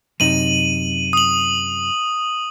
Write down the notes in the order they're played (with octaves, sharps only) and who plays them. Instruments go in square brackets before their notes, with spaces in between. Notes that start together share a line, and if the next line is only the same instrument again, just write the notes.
[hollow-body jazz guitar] F#2 C3 D#4 [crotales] D#7 F#7
[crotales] D#6 F#7